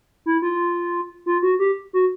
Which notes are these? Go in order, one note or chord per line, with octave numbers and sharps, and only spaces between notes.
E4
F4
F4
F#4
G4
F#4